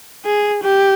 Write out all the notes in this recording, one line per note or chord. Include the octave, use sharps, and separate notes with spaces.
G#4
G4